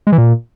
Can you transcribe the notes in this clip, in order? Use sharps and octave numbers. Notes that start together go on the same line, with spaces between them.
G#3
E3
A#2